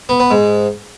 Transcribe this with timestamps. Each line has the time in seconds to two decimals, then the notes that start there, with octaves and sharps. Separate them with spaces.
0.09 B3
0.20 B3
0.30 G#2